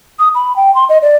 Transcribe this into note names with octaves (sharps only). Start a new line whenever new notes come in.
D#6
B5
G5
C6
D#5
D5